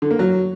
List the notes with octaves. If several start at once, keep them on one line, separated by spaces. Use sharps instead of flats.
D3
A#3
F#3